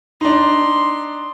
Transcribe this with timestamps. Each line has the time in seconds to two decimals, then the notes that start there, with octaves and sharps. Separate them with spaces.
0.21 D4 D#4 C6